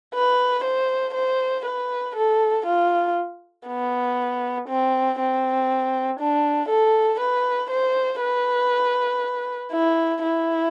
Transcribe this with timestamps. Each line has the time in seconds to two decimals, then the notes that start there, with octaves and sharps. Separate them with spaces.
0.14 B4
0.65 C5
1.15 C5
1.66 B4
2.16 A4
2.66 F4
3.67 B3
4.68 C4
5.19 C4
6.20 D4
6.69 A4
7.20 B4
7.71 C5
8.21 B4
9.72 E4
10.22 E4